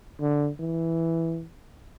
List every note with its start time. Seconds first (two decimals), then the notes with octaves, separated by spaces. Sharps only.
0.20 D3
0.60 E3